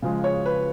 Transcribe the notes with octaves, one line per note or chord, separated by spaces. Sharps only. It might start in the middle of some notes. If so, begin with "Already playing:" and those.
C#3 F3 G#3
C#5
B4